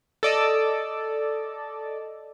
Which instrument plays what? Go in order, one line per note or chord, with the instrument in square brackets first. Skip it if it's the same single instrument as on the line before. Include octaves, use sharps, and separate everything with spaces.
[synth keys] A4 D5 D#5